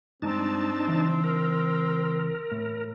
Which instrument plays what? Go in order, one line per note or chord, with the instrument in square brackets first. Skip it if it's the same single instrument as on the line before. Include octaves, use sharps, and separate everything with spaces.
[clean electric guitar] G2 G#3 A#5 [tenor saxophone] C4 [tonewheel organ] D4 D#4 A5
[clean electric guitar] C#2 E3 C5
[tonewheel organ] A#4
[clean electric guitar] A2